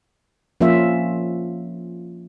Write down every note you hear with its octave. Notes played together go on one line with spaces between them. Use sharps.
F3 A#3 C#4 F4 E5